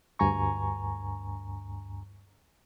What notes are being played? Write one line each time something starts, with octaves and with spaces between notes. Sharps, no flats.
D2 G2 G#5 A#5 C#6